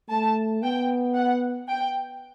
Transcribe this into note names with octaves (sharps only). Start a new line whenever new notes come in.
A3 A5
B3 G5
F#5
G5